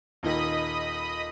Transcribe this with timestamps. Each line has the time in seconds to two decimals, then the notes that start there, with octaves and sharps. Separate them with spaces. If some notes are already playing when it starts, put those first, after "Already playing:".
0.23 D#1 A#2 D#3 D#5 B5 D#6